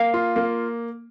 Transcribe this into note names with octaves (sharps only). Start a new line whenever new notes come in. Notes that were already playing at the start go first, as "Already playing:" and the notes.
Already playing: A#3 F5
F4
A#3